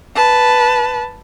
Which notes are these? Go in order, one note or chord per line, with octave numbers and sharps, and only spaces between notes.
B4 A5